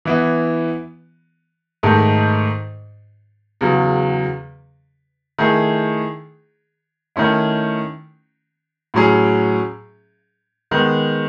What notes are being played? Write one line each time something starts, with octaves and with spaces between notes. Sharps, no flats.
E3 B3 E4
G#2 D#3 A3 D#4 A4
E2 C#3 F#3
D#3 A3 E4 G#4
D#3 A3 C#4 E4
A2 F#3 C#4 G#4
D#3 G#3 B3